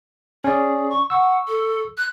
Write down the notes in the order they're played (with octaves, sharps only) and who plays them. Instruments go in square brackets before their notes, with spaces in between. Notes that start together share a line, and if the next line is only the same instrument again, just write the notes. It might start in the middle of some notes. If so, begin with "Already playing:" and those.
[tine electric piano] C#4 D5 [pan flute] G#4
[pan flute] C#6
[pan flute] F#5 [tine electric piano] C#6 E6
[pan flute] A4
F#6